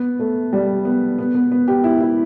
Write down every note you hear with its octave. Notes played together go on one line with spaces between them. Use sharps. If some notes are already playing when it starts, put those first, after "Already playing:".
Already playing: B3
A3
G3
B3
B3
B3
B3
G4
E4
E4